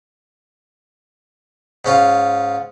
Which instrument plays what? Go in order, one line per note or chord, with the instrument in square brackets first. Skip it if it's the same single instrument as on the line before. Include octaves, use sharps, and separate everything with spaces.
[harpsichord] G#2 C#4 F4